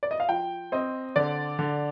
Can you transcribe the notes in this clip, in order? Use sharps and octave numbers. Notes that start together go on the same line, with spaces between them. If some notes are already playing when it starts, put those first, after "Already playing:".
D5
D#5
F5
F3 G5
C4 D#5
D3 D5
D3